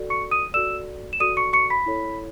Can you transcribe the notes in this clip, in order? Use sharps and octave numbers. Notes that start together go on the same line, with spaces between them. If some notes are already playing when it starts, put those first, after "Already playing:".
Already playing: F#4 A4 D5
C#6 C#7
D#6 D#7
F#4 A4 D5 E6 E7
E7
F#4 A4 D5 D#6 D#7
C#6 C#7
C#6 C#7
B5 B6
E4 A4 C#5